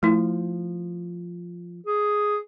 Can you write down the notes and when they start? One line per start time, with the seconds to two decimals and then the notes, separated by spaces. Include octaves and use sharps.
0.03 F3 A3 E4
1.86 G#4